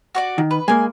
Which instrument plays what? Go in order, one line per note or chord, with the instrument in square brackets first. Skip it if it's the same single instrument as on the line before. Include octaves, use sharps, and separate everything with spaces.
[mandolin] F#4 C#5 D5
[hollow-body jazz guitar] D#3
[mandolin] B4
[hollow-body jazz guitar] G#3 A#3 [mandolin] G#5